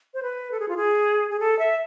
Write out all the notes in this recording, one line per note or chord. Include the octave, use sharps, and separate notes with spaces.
C5
B4
A4
G#4
F4
G#4
G#4
A4
E5